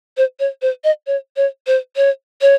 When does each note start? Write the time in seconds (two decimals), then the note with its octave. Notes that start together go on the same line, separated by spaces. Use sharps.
0.17 C5
0.40 C#5
0.62 C5
0.84 D#5
1.07 C#5
1.37 C#5
1.67 C5
1.96 C#5
2.41 C#5